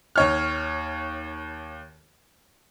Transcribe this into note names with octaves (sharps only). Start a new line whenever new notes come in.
D#2 C#5 F6